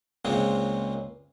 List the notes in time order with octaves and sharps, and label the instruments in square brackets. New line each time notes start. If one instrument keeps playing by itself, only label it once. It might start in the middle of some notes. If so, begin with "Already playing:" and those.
[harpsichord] C#2 A#2 C#3 G#3 C4